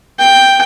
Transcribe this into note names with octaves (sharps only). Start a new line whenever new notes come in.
G5